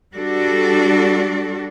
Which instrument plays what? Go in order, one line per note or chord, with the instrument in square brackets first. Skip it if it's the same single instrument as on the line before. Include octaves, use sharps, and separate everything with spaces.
[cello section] G3 D4 F#4 A4